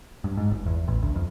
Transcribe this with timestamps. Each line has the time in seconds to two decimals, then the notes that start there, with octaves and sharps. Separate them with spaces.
0.24 G2
0.37 G#2
0.51 G1
0.66 E2
0.87 A1
1.02 D2
1.15 F2